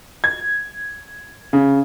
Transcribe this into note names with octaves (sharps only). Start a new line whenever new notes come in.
G#6
C#3